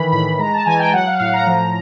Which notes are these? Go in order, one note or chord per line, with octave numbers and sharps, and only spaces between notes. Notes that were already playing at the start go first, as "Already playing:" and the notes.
Already playing: D#3 E3 B5
A2 B5
G#3 A#5
A5
E3 G#5
G5
F#3 F#5
F5
A2 F5
A#5
F3